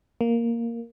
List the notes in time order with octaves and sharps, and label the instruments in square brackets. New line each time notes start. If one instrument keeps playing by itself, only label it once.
[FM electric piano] A#3